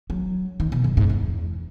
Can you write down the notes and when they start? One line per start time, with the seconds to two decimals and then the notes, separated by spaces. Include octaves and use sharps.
0.10 F#3
0.60 D#3
0.72 B2
0.84 F#2
0.97 G#2
1.10 E2